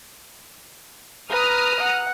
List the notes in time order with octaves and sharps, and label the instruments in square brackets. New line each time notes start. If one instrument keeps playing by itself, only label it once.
[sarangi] B4 [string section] A#5 D#6 F6
[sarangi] F#5